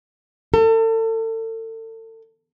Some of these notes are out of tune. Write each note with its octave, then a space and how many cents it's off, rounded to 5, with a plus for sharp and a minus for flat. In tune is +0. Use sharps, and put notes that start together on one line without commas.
A4 +35